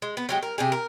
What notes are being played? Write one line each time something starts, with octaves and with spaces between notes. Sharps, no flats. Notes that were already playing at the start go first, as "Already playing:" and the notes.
G#3
B3
F#3 G#3 G4
A#4
C3 G4 G#4
A#4